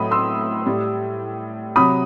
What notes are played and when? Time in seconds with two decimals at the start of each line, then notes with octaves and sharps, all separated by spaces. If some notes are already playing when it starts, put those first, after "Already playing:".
Already playing: A2 F#3 B5 D#6
0.11 C6 E6
0.66 A2 G3
1.76 C3 F#3 B5 D#6